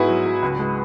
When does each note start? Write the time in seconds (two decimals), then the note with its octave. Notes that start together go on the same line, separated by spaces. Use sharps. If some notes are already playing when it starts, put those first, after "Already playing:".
Already playing: G#2 B3 E4 F#4 G#4 B4
0.08 F#3
0.26 F#3
0.42 C#2
0.59 G#3